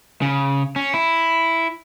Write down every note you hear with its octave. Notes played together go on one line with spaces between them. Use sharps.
C#3
C#4
E4